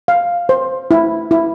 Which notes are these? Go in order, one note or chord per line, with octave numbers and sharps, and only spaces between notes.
F5
C5
E4
E4